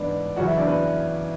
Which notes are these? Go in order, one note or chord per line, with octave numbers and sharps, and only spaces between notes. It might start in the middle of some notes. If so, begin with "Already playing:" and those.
Already playing: G#2 E3 B3 D4 B4 D5
F#2 C#3 E3 F#4 F#5
E4 E5
D4 D5
B3 B4